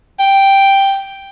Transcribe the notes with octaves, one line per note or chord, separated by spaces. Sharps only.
G5